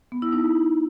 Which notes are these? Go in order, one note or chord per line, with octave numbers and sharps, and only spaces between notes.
B3
E4
D#4